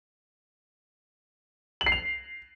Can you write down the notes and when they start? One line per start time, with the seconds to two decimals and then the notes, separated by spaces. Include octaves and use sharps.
1.81 F#7
1.86 C7
1.92 F7